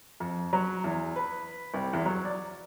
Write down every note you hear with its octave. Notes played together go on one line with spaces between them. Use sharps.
F2
F#3
E2
B4
C2
E2
F#3
D5